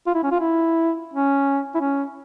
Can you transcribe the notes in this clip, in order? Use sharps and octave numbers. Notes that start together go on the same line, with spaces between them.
F4
E4
C#4
F4
E4
C#4
E4
C#4